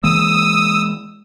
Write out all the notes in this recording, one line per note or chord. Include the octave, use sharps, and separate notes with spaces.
E3 G#3 A#3 D#6 E6